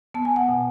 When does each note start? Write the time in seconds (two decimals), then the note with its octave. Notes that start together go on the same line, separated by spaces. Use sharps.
0.14 B3 A5
0.25 G#5
0.36 F#5 A5
0.49 B2